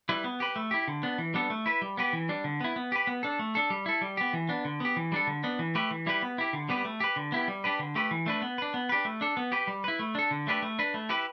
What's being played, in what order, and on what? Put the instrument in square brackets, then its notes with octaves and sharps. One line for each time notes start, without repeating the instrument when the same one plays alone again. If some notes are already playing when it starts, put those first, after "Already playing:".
[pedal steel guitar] G3 E4 B4
B3
G4 B4
A3
E4 G4
D3
B3 D4
E3
G3 B3 D4 A4
A3
E4 B4
G3
B3 G4 B4
E3
G3 D4
D3
B3 E4
B3
G4 B4
B3
D4 A4
A3
D4 A4
G3
E4 A4
G3
B3 G4
E3
B3 D4
D3
B3 G4
E3
G3 D4 A4
D3
B3 D4
E3
A3 G4 B4
E3
G3 E4 G4 B4
B3
E4 G4
D3
G3 B3 G4 B4
A3
G4 B4
D3
B3 E4 G4
G3
D4 G4 B4
D3
A3 G4 B4
E3
A3 D4 B4
B3
D4 B4
B3
D4 G4 B4
A3
D4 A4
B3
G4 B4
G3
E4 B4
A3
D4 A4
D3
A3 D4 G4 B4
A3
D4 B4
A3
E4 G4 B4